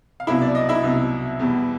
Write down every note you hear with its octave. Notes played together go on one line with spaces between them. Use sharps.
F5
C2 B2 F#3 E4 E5
D5
D#5
E4 E5
C2 B2 F#3
E2 B2 G3